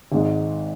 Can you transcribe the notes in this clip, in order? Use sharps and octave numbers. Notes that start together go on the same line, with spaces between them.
G#1 G#2 G#3